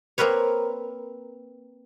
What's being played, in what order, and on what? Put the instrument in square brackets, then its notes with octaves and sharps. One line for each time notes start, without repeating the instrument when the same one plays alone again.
[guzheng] A#3 C4 A#4 B4 C#5